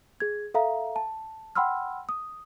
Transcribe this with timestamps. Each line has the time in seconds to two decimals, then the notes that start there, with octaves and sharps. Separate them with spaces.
0.20 G#4 G#6
0.54 A4 E5 F5 A#5
0.96 A5
1.55 F#5 G5 B5 C6 E6 F6
2.09 D#6